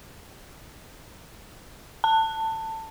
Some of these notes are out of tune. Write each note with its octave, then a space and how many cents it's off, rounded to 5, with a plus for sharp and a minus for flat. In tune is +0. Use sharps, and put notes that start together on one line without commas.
A5 +20